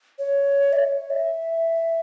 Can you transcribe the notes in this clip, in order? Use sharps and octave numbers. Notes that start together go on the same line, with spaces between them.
C#5
E5
C#5
E5